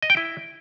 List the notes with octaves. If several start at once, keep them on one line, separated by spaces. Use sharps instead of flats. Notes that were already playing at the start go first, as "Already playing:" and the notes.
D#5
G5
E4